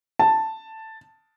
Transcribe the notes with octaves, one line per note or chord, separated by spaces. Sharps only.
A5